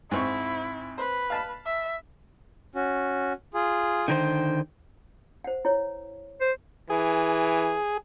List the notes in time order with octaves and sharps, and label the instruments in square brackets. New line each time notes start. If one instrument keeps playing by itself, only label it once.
[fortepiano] G#2 C4 C#6 [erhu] E4
[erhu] B4 [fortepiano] C5
[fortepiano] F5 A5 B5
[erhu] E5
[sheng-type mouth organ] C#4 F#4
F4 G#4
[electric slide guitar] D3 D#3 C5 [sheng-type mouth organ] G5
[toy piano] C5 F#5
E4 C#5
[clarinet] C5
[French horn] E3 [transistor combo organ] G#4